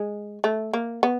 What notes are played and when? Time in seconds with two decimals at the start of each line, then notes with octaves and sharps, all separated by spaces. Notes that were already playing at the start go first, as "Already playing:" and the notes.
Already playing: G#3
0.44 A3
0.73 A#3
1.03 B3